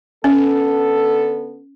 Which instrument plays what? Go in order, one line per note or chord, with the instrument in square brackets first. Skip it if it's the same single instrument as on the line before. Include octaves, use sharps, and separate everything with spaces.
[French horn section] D3 B3 A4 [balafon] C#4